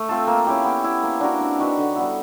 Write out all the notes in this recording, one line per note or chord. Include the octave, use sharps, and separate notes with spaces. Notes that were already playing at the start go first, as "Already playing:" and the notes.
Already playing: A3
C4 F4 A4
A#3
C#4 E4 G4
B3
E4 G4
A#3
D4 F#4 A#4
C4
D#4 F#4 B4
D3
G3 B3 E4